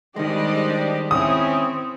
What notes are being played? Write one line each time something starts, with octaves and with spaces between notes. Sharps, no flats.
D#3 G3 G#3 D4 G4 C5 D5 D#5
C4 C#4 E4 D#6